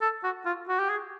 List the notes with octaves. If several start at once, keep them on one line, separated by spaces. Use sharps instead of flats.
A4
F#4
F4
F#4
G4
G#4